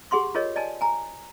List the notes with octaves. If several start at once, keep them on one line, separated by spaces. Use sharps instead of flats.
G4 G#4 F#5 C6 C#6
F4 G#4 A#4 C#5 D#5
D5 D#5 G#5 A5
G#5 A#5